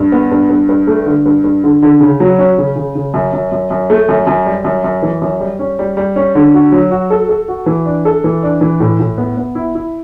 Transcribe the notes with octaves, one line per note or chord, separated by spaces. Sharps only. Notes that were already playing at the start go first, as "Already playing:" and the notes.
Already playing: G2
B3
G2
G2
G2
A3
D3
G2
G2
D3
D3
C#3
F#3
C#4
C#3
C#3
C#3
F#2
F#2
F#2
F#2
A3
F#2
F#2
G3
F#2
F#2
E3
F#2
G3
C#4
G3
G3
C#4
D3
F#4
F#3
F#4
A4
A4
F#4
E3
D4
A4
E3
D4
E3
A2
A2
B3
B3
E4
E4